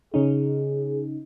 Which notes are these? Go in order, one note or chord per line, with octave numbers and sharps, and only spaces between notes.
C#3 C#4 D#4 G#4